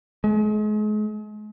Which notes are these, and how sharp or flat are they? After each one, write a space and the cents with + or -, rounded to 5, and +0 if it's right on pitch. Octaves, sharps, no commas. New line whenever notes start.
G#3 +35